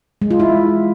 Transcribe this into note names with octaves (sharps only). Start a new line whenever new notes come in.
G#3
F4
E4